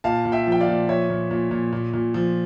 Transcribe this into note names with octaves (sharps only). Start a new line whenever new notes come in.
A#2 F5 A5
A#2
E5 G5
F3
G5
D5 F5
A#2
F3 C#5 E5
A#2
A#2
A#2
A#2
A#2
F3